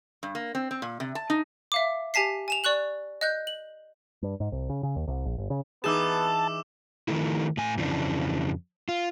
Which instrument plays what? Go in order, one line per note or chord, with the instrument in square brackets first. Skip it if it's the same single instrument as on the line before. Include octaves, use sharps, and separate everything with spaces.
[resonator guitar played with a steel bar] G2
A#3
C4
C4
A#2
C3
A5
D#4
[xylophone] E5 F5 D6
G4 G#5 A5 B6 C7
G#5 E7 F7
D5 C#6 F#6 F#7
D#5 F#6 G6
F#7
[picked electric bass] G2
G#2
C2
C#3
C#3
D#2
C2
A#1
G1
C#3
[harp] E3 D#4 G#4 [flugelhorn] B3 [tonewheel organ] A5 [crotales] D6 E6 E7
[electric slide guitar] D#3 F3 A3 E4
A2 G#5
F2 C#3 E3 D4
F4